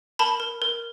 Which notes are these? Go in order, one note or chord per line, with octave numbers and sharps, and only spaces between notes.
A#4 A5 B5
A#4
A#4